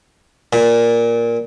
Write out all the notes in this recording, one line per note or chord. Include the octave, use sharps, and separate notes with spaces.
A#2